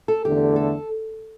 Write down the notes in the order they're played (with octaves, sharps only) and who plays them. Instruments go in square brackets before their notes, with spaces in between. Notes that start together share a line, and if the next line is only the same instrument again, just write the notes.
[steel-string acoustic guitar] A4
[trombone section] E2 D3 A3 [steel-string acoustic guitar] G4
[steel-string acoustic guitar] A4